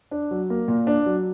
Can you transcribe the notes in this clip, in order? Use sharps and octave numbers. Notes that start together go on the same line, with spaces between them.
D4
F#3
A#3
A#2
D4
F#3